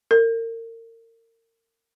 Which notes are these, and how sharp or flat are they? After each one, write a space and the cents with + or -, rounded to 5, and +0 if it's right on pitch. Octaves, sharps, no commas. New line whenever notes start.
A#4 -35